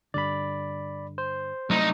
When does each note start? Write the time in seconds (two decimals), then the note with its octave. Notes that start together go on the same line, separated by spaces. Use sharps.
0.14 G2 D3 D5 B5
1.18 C5
1.70 C2 F#3 A3 D#4